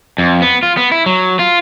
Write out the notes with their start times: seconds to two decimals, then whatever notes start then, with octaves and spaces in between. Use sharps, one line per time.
0.18 F2
0.42 B3
0.63 F4
0.77 B3
0.92 E4
1.06 F#3
1.39 F4